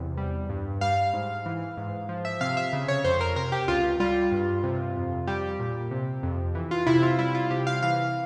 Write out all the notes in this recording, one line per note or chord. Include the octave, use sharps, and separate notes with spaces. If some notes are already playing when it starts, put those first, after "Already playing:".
Already playing: E2 C3
G3
G2
G3 F5
G#2
E3
G#2
F3
E5
C3 F5
E5
C#3
C#5
F2 C5
A#4
C3 A#4
G4
C#2 F4
G3 F4
G2
C3
F2
G3 G4
A#2
C3
F2
E3
F4
C3 E4
F4
G3 E4
F4
C3 G4
F5
E3 F5